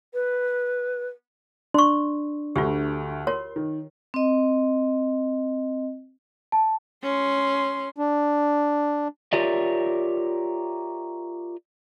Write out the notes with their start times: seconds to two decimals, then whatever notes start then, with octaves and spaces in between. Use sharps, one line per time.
0.14 B4
1.74 D4 C6 C#6
2.56 D2 A3 F4 G4
3.27 F4 A#4 C#5 C6
3.56 D#3
4.14 C4 D#5
6.52 A5
7.03 C#4 C6
7.97 D4
9.33 F4 G4 A#4 C#5 D5 E5